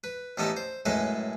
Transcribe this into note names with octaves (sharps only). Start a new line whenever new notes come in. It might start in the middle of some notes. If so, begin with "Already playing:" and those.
B4
A1 G3 B3 D#4 A4 A5
C5
F#2 A2 G#3 A4 B4 A5